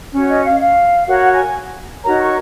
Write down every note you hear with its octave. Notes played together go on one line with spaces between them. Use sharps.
C#4 F#4 C#5
D#5
F5
F5
F#4 A#4 C#5 F#5
G#5
D#4 F#4 A#4 C#5 A#5
C#6